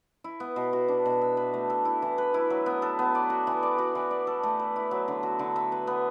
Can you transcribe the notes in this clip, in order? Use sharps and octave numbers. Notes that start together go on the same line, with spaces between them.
E4
B3
B2
F#4
D4
B2
E5
B4
A3
A4
E4
E3
B4
E4
F#3
B3
A4
B3
D5
F#4
E3
D5
F#4
E3
D5
A4
A3
B4
E4
F#3
D3
F#4
D3
E5
B4
B3